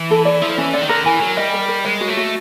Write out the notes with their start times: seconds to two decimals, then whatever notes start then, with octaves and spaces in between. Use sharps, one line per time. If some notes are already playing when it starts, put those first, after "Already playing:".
Already playing: E3
0.11 A4
0.25 D5
0.41 F3 E4
0.58 E3 C#4
0.73 D3 D5
0.82 D#3
0.89 D3 A#4
1.06 E3 G#5
1.21 F#3 A#4
1.37 G3 D#5
1.53 A#4
1.68 A#4
1.85 G#3 C#5
2.01 F#4
2.09 A3
2.17 F#4